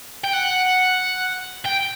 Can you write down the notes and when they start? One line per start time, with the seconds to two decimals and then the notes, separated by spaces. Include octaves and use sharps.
0.24 G5
0.33 F#5
1.65 G5